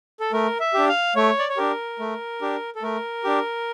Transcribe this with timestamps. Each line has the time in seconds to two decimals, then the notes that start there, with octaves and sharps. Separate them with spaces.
0.20 A4
0.32 A3 A#4
0.60 E5
0.74 D4 G4
0.89 F5
1.16 A3 C#5
1.39 D5
1.49 C#5
1.57 D4 G4 A#4
1.99 A3
2.42 D4 G4
2.75 A4
2.82 A3 A#4
3.24 D4 G4